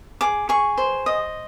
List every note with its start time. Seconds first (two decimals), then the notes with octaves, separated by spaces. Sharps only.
0.21 G#4 D6
0.49 G#4 C#6
0.78 C5
1.06 D#5